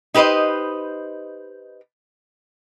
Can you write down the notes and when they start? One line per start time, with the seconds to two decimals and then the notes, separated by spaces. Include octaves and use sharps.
0.14 D#4 G4 B4 C5 D#5